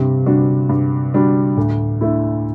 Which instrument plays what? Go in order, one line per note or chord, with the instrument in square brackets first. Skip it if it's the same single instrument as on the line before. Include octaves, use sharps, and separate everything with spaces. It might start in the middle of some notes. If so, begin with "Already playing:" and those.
Already playing: [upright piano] G2 [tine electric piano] C3
[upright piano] D3 G3 D4 F#4
G2
D3 G3 D4 F#4
[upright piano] D2 [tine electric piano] A2
[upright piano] D3 A3 E4